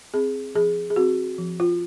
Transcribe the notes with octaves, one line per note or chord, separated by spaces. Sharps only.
C4 G#4
F3 G#4
G#4
C4 F#4
F3
F4